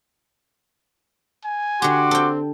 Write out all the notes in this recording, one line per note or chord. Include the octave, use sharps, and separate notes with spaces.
G#5
D3 F#4 G4 C6 D6
C4 A4 G5